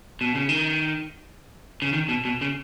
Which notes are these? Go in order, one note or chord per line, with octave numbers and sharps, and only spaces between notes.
B2
C#3
D#3
C#3
D#3
B2
B2
C#3